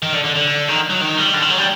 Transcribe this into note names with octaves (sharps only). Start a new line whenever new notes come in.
D#3
D3
D3
D3
D#3
F#3
D#3
G3
D3
D#3
F#3
G3